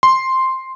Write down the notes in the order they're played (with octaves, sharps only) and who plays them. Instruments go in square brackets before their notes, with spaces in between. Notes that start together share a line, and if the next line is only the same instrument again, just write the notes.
[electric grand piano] C6